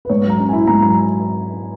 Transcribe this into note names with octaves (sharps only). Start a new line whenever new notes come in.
B4
G#2 C#5
F#3
A#5
C#4
G#5
E4
G#2 A#5
F#3 A#5